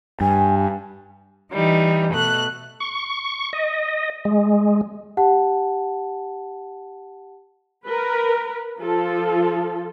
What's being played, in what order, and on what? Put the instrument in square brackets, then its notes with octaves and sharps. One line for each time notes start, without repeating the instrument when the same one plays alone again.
[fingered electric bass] G2 [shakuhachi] G#5
[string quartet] E3 G3 D#4
B2 A3 F#6
[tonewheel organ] C#6
D#5
G#3
[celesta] G4 F#5 A5
[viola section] A#4 B4
F3 F4 A4